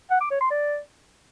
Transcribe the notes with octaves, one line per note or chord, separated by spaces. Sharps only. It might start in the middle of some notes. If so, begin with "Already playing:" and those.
F#5
D6
C#5
C6
D5